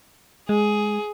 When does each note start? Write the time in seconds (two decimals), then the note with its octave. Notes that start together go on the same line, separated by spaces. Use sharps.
0.49 G#3 G#4